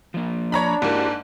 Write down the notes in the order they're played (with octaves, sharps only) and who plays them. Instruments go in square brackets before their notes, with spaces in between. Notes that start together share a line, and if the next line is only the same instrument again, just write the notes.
[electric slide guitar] F3 A#3
[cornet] D4 [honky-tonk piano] C#5 A#5 B5
[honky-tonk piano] G#2 A#3 [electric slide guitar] E4 F#4 G4